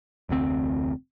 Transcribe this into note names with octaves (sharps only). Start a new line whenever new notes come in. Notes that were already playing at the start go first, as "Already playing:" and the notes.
F1 D2 A#2 C4